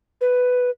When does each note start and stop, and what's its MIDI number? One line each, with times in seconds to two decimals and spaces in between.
0.21 0.70 71